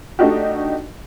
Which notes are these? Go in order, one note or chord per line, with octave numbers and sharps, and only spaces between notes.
A3 D4 D#4 F#4 G4